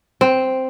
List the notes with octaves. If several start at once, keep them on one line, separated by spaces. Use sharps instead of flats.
C4